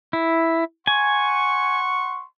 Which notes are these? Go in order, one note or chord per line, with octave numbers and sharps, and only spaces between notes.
E4
F#5 G#5 C6 C#6